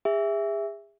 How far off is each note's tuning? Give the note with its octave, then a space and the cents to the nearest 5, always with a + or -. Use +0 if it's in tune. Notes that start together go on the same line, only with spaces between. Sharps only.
G#4 -35 E5 +0